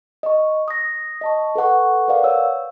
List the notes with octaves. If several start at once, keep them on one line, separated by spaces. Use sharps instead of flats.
D#5 C#6
D#6 A#6
D#5 A5 C#6
A4 B4 F#5 C#6
A#4 B4 D5 F5 F#5
C#5 E6